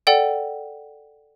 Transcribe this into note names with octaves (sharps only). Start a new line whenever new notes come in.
A4 D5 F#5 G5